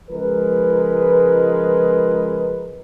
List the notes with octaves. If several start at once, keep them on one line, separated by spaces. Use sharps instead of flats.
C#2 F3 G#3 A#4 B4